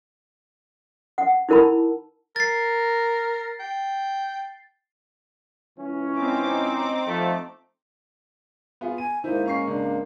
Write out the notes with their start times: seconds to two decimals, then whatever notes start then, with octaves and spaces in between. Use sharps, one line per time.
1.18 F#5
1.49 D#4 E4 A#4 A5 B5
2.36 A#4 A6 C7
3.60 G5
5.77 C#2 E3 C#4
6.19 C4 D#4 D6
7.06 F3 A3
8.81 B3 F4 G#4
8.98 G#5 D#7
9.24 G#2 D#3 A#3 D#4 E4 C5
9.46 C#4 F5 C#6 C7
9.68 C#2 D4